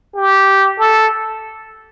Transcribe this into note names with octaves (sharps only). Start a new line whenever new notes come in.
G4
A4